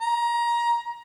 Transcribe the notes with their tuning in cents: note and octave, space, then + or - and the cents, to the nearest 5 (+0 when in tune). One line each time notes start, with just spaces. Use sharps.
A#5 +20